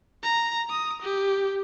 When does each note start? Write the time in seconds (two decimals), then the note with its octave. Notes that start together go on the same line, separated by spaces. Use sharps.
0.23 A#5
0.70 D#6
1.02 G4